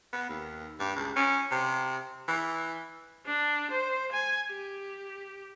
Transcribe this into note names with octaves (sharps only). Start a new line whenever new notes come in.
B3
D#2
G2
C#2
C#4
C3
E3
D4
C5
G#5
G4